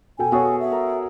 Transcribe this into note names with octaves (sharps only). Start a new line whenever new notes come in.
B2 A4 G5 G#5
B3 F#4 G#4 A4 C#5
E5
A#4